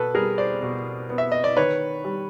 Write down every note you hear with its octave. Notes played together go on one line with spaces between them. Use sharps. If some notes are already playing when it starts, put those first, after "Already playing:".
Already playing: B2 A4 B4
G3 G#4 A#4
C5 D5
B2
B3
E5
D#5
D5
D#3 B4 C#5
G3